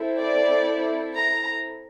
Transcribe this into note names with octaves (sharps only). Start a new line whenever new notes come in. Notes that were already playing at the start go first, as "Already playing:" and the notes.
Already playing: C4 E4 A4
D5
A#5